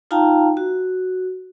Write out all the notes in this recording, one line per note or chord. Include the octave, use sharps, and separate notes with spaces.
D#4 F4 F5 G5 A5 A#5
F#4